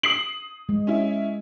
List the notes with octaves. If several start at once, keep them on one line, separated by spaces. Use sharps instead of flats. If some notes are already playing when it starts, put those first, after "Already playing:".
D#6 C7 F#7
G#3
C#4 E4